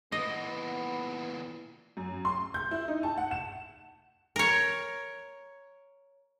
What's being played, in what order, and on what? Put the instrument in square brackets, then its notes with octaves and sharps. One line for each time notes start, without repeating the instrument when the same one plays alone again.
[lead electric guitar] A#2 E3 [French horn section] B3 [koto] D#5
[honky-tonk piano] F#2
C6
G6
E4
D#4
A5
F#5
E7
[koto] A#4 C#5